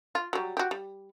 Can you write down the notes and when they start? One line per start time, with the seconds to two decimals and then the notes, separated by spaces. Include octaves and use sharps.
0.15 F4
0.33 F#3 G3
0.57 F#4 G4
0.71 G3